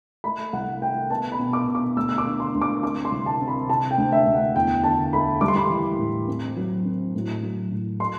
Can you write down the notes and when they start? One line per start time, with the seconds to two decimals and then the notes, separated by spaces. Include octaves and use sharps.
0.24 A3 B5
0.53 C2 F#5
0.82 A3 G5
1.10 B3 A5
1.32 B5
1.39 B2
1.53 D6
1.68 B2
1.75 D6
1.96 D2 E6
2.09 E6
2.18 D6
2.26 D3
2.40 C6
2.55 D2
2.62 D6
2.83 C4 D6
3.05 C6
3.12 C2
3.26 A5
3.41 C4
3.48 B5
3.69 C3 A5
3.91 G5
3.98 D2
4.12 E5
4.27 D2
4.34 F#5
4.55 E2 G5
4.84 D3 A5
5.13 A3 B5
5.41 G3 D6
5.48 C6
5.56 B5
5.63 C6
5.70 E3
5.99 A2
6.28 C4
6.57 F#3
6.85 C4
7.15 A2
7.43 F#3
7.72 A2
8.00 C6